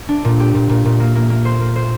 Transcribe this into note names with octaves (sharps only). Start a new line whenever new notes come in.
D4
A#2
G4
A#2
A#2
A#2
A#3
A#3
A#3
C5
A#3
C5